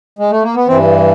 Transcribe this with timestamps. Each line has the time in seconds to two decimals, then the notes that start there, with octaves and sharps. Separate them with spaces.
0.19 G#3
0.31 A3
0.43 A#3
0.55 B3
0.68 G2 E3 C4